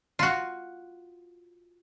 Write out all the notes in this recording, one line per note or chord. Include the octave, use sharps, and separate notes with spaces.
F4 F#4